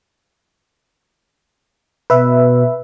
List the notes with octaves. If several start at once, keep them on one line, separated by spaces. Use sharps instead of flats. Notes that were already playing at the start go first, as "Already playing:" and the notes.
B2 B4 E5